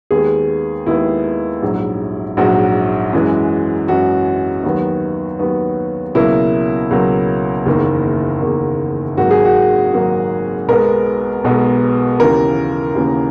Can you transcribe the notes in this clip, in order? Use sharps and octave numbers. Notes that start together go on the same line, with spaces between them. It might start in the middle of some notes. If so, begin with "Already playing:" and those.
D#2 D#3 G#3 B3 G#4
D#2 D#3 G#3 B3 E4
A#1 G#2 F#3
A#1 G#2 F#3 F#4
F#2 E3 G#3
F#2 E3 G#3 F#4
D#2 D#3 F#3 B3
D#2 D#3 F#3 B3
C#2 B2 F#3 A#3 E4
C#2 B2 F#3 A#3
F#1 E2 D#3 A#3
F#1 E2 D#3 A#3
G#1 G#2 F#3 A#3 F#4
G#4
F#4
G#1 G#2 F#3 A#3
B1 B2 G#3 B3 A#4
B1 B2 G#3 B3
D#2 C#3 E3 A#3 A#4
D#2 C#3 E3 A#3